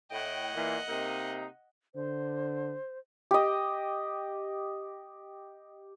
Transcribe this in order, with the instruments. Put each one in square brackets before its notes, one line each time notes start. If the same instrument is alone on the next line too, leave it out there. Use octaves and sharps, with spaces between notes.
[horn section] A2 G5 [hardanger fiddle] D#5 F#5
[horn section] A#2 E3 B3
C3 A#3 D#4
[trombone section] D3 [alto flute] C5
[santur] G4 D#5